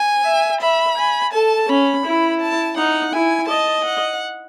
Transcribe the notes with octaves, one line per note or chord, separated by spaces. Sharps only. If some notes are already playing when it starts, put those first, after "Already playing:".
Already playing: G#5
E5
E5 B5
G#5
A4 A5
C#4 B5
E4
A5
D#4 F#5
E4 G#5
D#5 A5
F#5